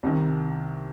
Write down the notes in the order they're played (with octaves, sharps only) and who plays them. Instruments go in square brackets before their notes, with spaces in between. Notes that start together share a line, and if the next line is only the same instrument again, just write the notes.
[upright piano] C2 C3 D#3